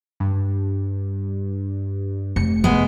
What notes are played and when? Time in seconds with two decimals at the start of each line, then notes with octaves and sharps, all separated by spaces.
0.20 G2
2.36 F1 C#7
2.64 G#3 B3